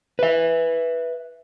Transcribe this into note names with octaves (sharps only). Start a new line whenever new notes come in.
B4 E5